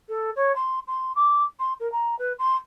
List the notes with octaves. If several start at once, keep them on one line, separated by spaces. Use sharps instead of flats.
A4
C#5
C6
C6
D6
C6
A#4
A#5
B4
C6